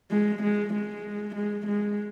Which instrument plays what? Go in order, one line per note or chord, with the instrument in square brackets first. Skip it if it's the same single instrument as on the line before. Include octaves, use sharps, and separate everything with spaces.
[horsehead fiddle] G#3
G#3
G#3
G#3
G#3